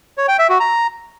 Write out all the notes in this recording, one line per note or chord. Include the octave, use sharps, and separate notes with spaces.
C#5
G5
E5
F#4
A#5